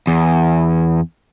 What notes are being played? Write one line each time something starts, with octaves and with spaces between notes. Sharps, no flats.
E2